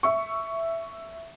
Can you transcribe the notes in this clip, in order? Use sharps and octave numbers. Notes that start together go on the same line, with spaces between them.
E5 C#6